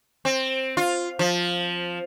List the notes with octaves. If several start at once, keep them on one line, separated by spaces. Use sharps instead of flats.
C4
F4
F3